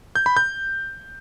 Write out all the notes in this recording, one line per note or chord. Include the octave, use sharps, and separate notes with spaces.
G6
B5
G6